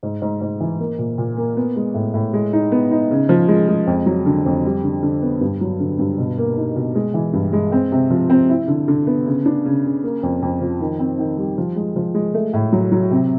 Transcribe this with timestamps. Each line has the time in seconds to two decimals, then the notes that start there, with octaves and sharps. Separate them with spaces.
0.03 G#2
0.22 G#2
0.41 G#2
0.60 E3
0.80 A#3
0.98 A#2
1.18 A#2
1.37 A#3
1.57 B3
1.76 G#3
1.94 A2
2.14 A2
2.33 G#3
2.53 D#4
2.72 B3
2.91 D#4
3.11 C#3
3.29 F3
3.48 G#3
3.69 G#3
3.87 F2
4.06 F#3
4.26 D3
4.46 F2
4.64 G3
4.84 D3
5.03 D3
5.22 B3
5.41 G2
5.61 F#3
5.79 D3
5.99 G2
6.18 B2
6.38 A#3
6.57 D#4
6.76 B2
6.95 G#3
7.14 E3
7.33 G2
7.53 G#3
7.72 C4
7.92 C3
8.10 F3
8.30 C4
8.50 E4
8.68 D3
8.88 D3
9.07 B3
9.26 C#3
9.46 D4
9.65 C#3
9.84 C#3
10.04 A#3
10.23 F2
10.42 F2
10.61 F3
10.80 D#3
10.99 C4
11.19 D#3
11.37 G3
11.58 F3
11.76 G#3
11.96 F3
12.14 G#3
12.34 A3
12.53 A2
12.73 F#3
12.92 F#3
13.11 C3